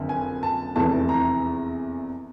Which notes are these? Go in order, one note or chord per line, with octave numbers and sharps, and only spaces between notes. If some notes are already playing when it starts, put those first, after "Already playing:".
Already playing: F#1 F2 D3
G#5
A5
F1 E2 C3 E3 A5
A#5